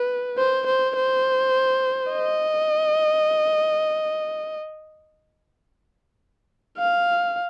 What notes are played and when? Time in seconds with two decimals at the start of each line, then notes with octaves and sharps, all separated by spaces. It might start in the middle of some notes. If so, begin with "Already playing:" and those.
Already playing: B4
0.38 C5
0.67 C5
0.96 C5
2.12 D#5
6.78 F5